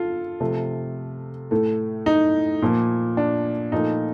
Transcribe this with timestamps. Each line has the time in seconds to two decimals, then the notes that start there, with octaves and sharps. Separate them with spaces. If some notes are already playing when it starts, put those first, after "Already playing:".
Already playing: D3 F4 A4
0.40 C3 F3 A3
1.51 A2 A3
2.06 D#4
2.62 A#2 F3 A#3
3.17 D4
3.72 A#2 F3 A3 D#4